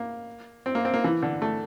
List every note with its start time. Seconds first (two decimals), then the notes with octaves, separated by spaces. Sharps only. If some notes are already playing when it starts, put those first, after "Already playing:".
Already playing: A#3
0.66 C4
0.75 A#3
0.85 C4
0.94 A#3
1.04 E3
1.23 D3
1.42 A3